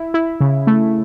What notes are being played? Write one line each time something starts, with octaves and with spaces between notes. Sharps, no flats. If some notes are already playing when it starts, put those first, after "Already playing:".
Already playing: E4
E4
C#3
A3